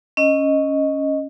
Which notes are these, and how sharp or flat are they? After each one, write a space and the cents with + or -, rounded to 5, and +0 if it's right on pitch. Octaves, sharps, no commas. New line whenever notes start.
C#4 +0 D#5 +0